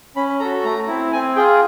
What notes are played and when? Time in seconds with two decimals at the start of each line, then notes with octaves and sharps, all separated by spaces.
0.16 C#4 B5
0.40 F#4 A4 A#5
0.64 A3 A#5
0.88 C4 E4
1.12 C4 G#5
1.36 F4 G#4 G5